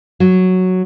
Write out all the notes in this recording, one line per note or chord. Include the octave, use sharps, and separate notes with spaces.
F#3